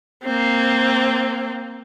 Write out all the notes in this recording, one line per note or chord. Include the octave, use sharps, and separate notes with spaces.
A#3 C4